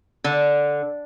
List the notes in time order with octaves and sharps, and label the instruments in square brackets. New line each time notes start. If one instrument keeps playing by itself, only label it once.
[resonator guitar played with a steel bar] D3